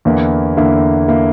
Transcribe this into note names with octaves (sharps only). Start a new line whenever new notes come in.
E2 D3 A#3 E4
E2 D3 A#3 E4
D3 A#3 E4